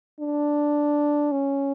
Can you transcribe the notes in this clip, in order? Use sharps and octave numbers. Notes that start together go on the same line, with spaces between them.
D4
C#4